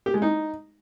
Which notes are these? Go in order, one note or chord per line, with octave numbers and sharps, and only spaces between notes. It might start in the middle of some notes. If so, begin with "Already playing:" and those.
G4
G#3
D#4